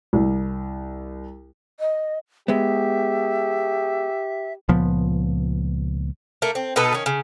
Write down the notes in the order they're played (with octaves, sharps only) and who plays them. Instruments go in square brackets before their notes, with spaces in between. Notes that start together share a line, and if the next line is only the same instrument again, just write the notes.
[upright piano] C2
[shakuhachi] D#5
[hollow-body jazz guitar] G#3 B3 [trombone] G4 [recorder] E5
[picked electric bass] C#2 A#2 F3 B3
[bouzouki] A3 A#3
C4
B2 D#4 A4 B4
D#3 C#4
C#3